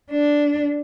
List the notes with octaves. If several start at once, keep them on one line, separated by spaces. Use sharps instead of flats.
D4